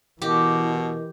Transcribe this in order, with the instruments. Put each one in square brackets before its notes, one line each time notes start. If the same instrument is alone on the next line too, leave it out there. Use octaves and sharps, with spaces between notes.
[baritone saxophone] B2 [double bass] E3 [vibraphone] E4 A#4 D#5 [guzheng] G4